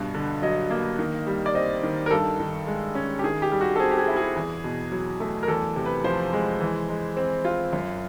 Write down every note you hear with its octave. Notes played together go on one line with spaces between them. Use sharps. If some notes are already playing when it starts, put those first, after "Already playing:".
Already playing: G2 B2
D3
F#3 D#5
A#3
D#3
G3
D5
C4 D#5
D#3
A#4
G2 A4
D#3
G#3
C#4
G4
D#3 G#4
G4
G3
F#4
A4
C4 G#4
G4
G#4
E4
G#4
E2
B2
F#3
A3
A#4
E2 A4
C3
B4
F3 C5
G#3
E3
G#3
C4
F4
F#2